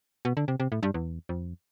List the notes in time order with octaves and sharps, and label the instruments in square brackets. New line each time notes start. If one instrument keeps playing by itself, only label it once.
[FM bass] B2
D3
C3
C3
A2
G2
E2
F2